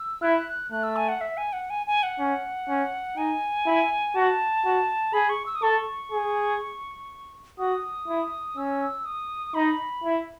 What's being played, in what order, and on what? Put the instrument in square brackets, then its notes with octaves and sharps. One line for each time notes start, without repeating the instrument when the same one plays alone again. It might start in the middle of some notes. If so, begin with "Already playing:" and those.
Already playing: [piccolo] E6
[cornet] E4 [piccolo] F#6
[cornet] A3 [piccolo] F#6
[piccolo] E6
G#5
F#5
E5
G#5
F#5
G#5
G#5
F#5
[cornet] C#4
C#4
[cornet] D#4 [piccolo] G#5
[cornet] E4
[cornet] F#4 [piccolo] A5
[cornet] F#4
[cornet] G#4 [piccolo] B5
[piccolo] C#6
E6
D#6
[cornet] A4 [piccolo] C#6
[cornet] G#4
[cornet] F#4 [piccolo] D#6
[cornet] E4
[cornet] C#4 [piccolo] E6
[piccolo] D#6
[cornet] D#4 [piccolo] B5
[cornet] E4